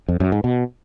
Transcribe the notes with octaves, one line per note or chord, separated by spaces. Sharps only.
F2
F#2
G#2
B2